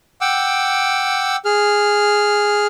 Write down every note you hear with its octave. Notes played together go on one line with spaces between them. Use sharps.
F#5 G5 D6 E6
G#4 F6